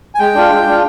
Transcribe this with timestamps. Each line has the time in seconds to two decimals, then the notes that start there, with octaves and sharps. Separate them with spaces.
0.15 G#5
0.19 G#3 G5
0.35 D4 F4
0.50 G#3
0.67 D4 F4